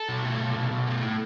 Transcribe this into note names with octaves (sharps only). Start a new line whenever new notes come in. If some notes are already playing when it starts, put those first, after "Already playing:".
Already playing: A4
B2
A3
B2
B2
B2
A3
A2